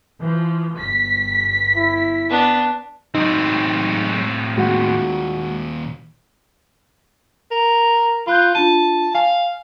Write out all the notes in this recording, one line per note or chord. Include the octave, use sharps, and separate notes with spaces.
E3 F3
G1 B6
E4
B3 D4
A2 F#3 G#3 C4 D#4
D#2 A#2 G#3 F#4 F#5
A#4
F4 B5 F#6 G6
D4 F4 A5 D#7
F5 G#5